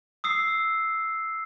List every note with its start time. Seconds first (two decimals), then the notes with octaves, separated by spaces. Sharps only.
0.24 D#6 E6 C7